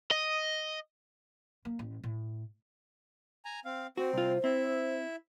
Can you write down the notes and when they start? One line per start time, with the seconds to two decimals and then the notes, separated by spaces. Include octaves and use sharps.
0.11 D#5
1.65 A#3
1.79 A1
2.04 A2
3.45 G#5 A#5
3.65 C4 F5
3.97 C4 F#4 C5
4.13 C2 F4
4.44 C4 E4 E5